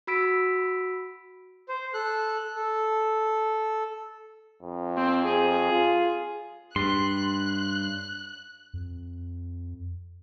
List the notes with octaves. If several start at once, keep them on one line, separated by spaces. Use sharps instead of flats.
F#4 B5 E6 B6 D7
C5
A4 F#6
A4
F2
C4
G#4
F4
G2 C6 F#6
F2